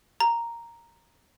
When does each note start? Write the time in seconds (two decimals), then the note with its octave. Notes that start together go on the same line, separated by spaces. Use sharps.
0.20 A#5